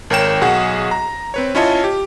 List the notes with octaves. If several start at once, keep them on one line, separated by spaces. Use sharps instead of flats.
G#1 A#4 C#5 G5 E7
B1 F#4 G#4 F#5
A#5
C4 B4 C#5
C#4 E4 F4 C#5 D#5 A5
G4